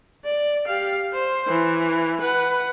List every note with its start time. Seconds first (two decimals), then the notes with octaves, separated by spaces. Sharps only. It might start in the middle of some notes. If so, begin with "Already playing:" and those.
0.24 D5
0.68 G4 F5
1.13 C5
1.48 E3
2.21 B4 F#5